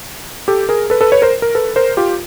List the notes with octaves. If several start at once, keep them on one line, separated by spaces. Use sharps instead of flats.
G4 A4
G#4 A#4
A4 B4
A4 B4
B4 C#5
A#4 C5
A#4
A4 B4
A#4 C5
F4 G4